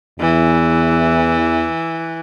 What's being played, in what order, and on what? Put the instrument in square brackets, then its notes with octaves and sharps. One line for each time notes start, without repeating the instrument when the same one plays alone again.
[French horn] E2 [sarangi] E3